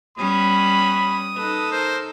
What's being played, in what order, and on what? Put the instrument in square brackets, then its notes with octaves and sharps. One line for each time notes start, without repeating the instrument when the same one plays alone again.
[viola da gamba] G3 B3 C#4 [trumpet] B5 [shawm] D#6
[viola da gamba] D#4 A4 [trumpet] B4
[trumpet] A#4 [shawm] C5